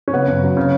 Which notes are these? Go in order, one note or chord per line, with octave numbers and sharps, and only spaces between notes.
C#4
C#3 B3
F#2
F#3
C#3